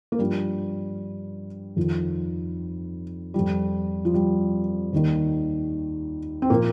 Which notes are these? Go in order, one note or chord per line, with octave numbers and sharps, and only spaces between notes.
A#3
G2 F3 G3
F2 D#3 F3
F2 F3 G3
F3
G3
D#2 D#3
C4
A#2 F3 A#3